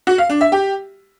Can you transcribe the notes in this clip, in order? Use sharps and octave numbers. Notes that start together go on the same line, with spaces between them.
F#4
F5
D4
E5
G4